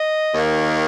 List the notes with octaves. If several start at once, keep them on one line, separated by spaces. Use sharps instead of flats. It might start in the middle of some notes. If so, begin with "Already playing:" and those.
Already playing: D#5
D#2 D#3 A#3